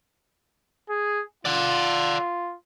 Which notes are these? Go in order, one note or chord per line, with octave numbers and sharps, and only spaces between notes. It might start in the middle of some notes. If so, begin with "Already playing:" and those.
G#4
F4 D5 F#5